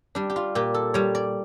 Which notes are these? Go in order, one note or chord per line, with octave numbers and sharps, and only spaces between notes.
G3 D4
G4
F4
A#2 G4
A4
G3 C#5
D5